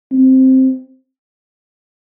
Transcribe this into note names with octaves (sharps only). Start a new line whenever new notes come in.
C4